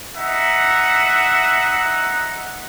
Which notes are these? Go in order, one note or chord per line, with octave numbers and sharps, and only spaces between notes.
D#4 E5 F#5